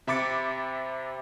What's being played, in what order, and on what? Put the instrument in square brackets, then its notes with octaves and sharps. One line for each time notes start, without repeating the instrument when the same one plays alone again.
[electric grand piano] C3 E5 B5 D6 A6 C#7